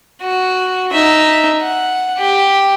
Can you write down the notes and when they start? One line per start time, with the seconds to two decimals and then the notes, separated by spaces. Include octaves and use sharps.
0.22 F#4
0.91 D#4 E5
1.61 F#5
2.18 G4